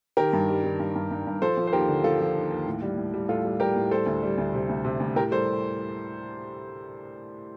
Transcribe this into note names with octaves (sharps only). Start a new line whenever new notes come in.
D#3 G4 A#4
G2
G3
D#3
G2
G2
G2
G2
F3 A4 C5
F3
C5
D#2 G4 A#4
D3
F3 F4 A4
F3
D#2
D#2
A2
G3
A2
G3
A2 F4 A4
G3
G3 G4 A#4
A2
G3 A4 C5
D2
G3
D2
C3
D2
C3
D2
A2 G4 A#4
G3 A4 C5